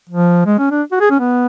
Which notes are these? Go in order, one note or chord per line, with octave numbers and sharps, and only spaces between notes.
F3
G#3
C#4
D4
F#4
G#4
C#4
B3